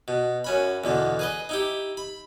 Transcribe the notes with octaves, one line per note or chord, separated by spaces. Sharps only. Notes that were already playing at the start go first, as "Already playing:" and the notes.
B2
F#2 C#4 B5
E2 B2 D3
G#4 B4 D#5
D#4 E4 G4
B5